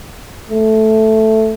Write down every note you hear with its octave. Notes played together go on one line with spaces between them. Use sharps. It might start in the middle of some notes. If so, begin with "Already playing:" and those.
A3